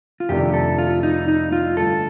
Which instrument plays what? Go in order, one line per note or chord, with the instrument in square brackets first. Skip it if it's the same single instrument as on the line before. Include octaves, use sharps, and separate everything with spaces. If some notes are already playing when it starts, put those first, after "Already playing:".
[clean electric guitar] F4
[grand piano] F2 C3 D#3 A3 D4 [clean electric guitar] G4
[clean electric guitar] A4
F4
D#4
D#4
F4
[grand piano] G2 D3 A3 [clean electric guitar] A4